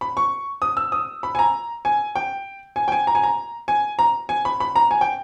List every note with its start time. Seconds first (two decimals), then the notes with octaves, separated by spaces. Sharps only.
0.01 B5
0.17 C#6
0.62 D#6
0.77 E6
0.92 D#6
1.23 B5
1.35 G#5
1.39 A#5
1.85 G#5
2.16 G5
2.76 G#5
2.88 G5
2.92 G#5
3.07 A#5
3.15 G#5
3.24 A#5
3.68 G#5
3.99 A#5
4.29 G#5
4.45 B5
4.60 B5
4.76 A#5
4.91 G#5
5.01 G5